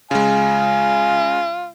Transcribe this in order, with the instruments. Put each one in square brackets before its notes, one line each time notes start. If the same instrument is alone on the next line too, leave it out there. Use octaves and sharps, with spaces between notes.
[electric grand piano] C#3 G#3 [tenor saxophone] F4 [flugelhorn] G#5